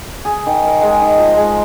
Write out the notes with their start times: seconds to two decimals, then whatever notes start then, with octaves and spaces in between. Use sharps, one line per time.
0.25 G#4
0.46 D#3
0.66 A#4
0.82 G#3
1.01 D#4
1.18 F3
1.36 G#3